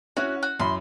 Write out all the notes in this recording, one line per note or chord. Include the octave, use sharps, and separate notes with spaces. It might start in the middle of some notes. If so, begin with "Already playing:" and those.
C#4 E4 F#4
F#4
F#2 E4 B5 C6